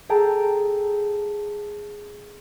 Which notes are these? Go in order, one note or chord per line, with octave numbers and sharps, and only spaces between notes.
G#4 A4 G5 A5 A#5